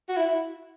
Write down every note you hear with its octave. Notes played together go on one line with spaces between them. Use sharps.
F#4
E4